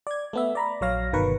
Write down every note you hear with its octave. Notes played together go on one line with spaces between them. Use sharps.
D5 G#6
A3 B3 E5
D5 A#5 B5
A#1 F#3 C#5 F5 A#6
G1 B2 D#3 A#4 B4 C#6